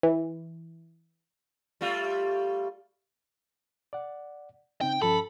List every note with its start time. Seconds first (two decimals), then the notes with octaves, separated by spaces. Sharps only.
0.03 E3
1.81 G3 A3 F4
3.93 D5 F#5
4.81 C#3 C4 D#4 G5
5.02 G2 F3 C#4 A4 B5